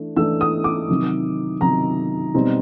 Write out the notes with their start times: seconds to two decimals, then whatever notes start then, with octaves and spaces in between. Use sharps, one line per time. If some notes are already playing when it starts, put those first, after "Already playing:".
Already playing: E3 A3 D4
0.17 E3 A3 D4 E6
0.41 D#6
0.64 D6
0.89 C3 D#3 F#3
1.61 C3 D#3 F#3 A#5
2.34 B2 G3 C4 D#4